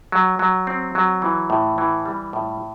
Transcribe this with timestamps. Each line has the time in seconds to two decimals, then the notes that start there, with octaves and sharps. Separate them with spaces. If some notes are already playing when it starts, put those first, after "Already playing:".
0.12 F#3
0.39 F#3
0.67 C4
0.95 F#3
1.22 E3
1.50 A2
1.78 E3
2.05 G3
2.33 A2